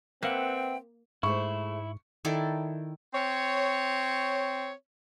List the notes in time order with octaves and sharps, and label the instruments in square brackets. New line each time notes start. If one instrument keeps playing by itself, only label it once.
[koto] A#3 [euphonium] C4 [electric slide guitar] B4 E5 F#5 [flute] G5
[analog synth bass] G#2 [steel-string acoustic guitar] G#3 A3 C5 [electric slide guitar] E4 [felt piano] C#6
[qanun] D#3 E4 A4 D5
[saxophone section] C4 C#5